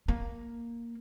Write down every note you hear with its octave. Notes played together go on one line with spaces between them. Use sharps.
A#3